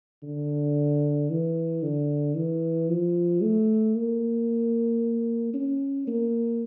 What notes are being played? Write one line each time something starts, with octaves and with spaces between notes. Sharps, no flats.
D3
E3
D3
E3
F3
A3
A#3
C#4
A#3